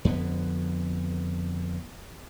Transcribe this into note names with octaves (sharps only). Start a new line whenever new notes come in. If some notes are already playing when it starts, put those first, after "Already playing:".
F2 D3 B3